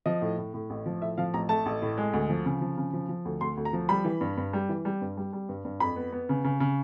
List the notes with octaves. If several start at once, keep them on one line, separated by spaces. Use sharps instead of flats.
F3 D#5
A2
A2
A2
A1
F3
A2 E5
F3 F5
A1 A#5
A3 A5
A1
A2
G#3
D2
F3
C#3
F3
C#3
F3
F3
D2
D2 C6
D2
A#5
F3
G3 B5
E3
G2
G2
G3
E3
G3
G2
G3
G3
G2
G2
F2 B5
B3
B3
C#3
C#3
C#3